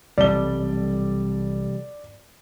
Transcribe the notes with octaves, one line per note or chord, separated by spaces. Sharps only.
B1 C3 E3 G3 C4 A4 D5 G7